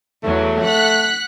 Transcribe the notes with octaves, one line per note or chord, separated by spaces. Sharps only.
E2 F#3 A3
F#5 F#6 B6